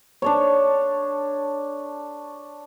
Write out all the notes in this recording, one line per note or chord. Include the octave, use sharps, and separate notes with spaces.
D4 A4 C#5